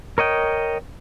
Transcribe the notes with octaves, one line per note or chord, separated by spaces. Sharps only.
A#4 C#5 D#5 G5